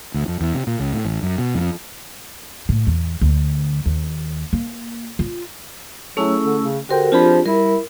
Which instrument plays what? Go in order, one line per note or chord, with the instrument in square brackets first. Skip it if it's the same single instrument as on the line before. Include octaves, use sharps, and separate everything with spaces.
[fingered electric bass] D2
F2
E2
C3
A#2
C#2
A2
A1
F#2
B2
F2
[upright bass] A2
E2
D2
D#2
A#3
F4
[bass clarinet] F#3 [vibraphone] A3 C#4 E6 [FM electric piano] E4 G#4 A4
[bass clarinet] D3
C#3
[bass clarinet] D3 [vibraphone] F#4 A#4 [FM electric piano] G4 C5 G5
[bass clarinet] F3 [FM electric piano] C4 D4 B5 [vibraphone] F4 G4 G#4
[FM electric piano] G3 [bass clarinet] E4 [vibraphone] A#4